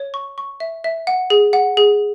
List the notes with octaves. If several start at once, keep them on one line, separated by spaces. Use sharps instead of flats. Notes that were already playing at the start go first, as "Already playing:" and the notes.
Already playing: C#5
C#6
C#6
E5
E5
F#5
G#4
F#5
G#4